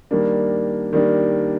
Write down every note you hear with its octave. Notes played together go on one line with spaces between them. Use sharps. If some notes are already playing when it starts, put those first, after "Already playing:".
D#3 G3 A#3 D4
D#3 G3 A#3 D4